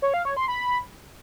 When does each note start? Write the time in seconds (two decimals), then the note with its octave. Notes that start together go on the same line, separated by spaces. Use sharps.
0.02 C#5
0.14 F5
0.25 C#5
0.37 C6
0.48 B5